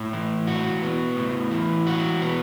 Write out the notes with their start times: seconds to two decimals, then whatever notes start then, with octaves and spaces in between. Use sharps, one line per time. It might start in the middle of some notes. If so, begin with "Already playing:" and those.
Already playing: A2
0.13 E3
0.47 F#4
0.83 B3
1.16 A2
1.51 E3
1.87 F#4
2.22 B3